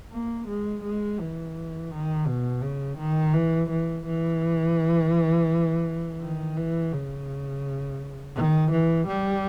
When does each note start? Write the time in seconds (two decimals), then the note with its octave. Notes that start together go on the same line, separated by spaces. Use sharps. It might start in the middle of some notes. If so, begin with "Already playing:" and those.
0.12 A#3
0.47 G#3
0.83 G#3
1.19 E3
1.91 D#3
2.27 B2
2.63 C#3
2.98 D#3
3.34 E3
3.70 E3
4.06 E3
6.21 D#3
6.57 E3
6.92 C#3
8.36 D#3
8.72 E3
9.08 G3